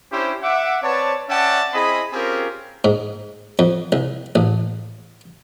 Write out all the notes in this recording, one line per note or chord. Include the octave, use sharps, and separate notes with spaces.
C#4 D4 E4 G4 C5
E5 F#5 D6
C4 B4 C#5 D5 A5
C#4 D5 E5 F#5 G5 A5
C4 E4 G#4 D#5 B5
C4 C#4 F4 G4 G#4 A#4
G#2
F2
C2
A1